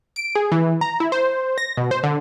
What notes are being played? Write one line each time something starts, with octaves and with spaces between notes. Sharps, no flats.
D7
G#4
E3
A#5
E4
C5
A#6
B2
C5
D3